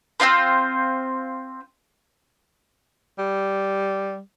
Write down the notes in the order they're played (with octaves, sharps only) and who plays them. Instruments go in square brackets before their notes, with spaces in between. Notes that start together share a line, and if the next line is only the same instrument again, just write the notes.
[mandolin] C4 D4 F4 C5
[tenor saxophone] G3